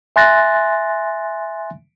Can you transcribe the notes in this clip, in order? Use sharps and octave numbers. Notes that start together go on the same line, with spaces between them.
E5 G#5 C6 F#6 A6 A#6